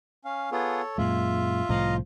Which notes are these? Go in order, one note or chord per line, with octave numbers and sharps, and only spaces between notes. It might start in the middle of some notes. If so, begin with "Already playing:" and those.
C#4 F5
B3 F4 G#4 A4 C#5
F#2 A#2 G#3 F4 E5
C2 A2 F3 D#5 F5 A#5